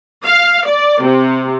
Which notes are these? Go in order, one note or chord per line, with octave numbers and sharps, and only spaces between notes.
F5
D5
C3